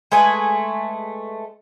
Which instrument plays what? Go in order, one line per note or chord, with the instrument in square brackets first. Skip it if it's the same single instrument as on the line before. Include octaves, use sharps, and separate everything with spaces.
[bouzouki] G#3 A3 B4 G#5